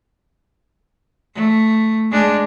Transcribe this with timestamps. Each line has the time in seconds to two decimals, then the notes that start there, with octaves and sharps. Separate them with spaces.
1.35 A3
2.11 G#3 D4